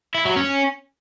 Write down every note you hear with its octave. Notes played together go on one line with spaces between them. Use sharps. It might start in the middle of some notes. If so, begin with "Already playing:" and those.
E4
F#3
C#4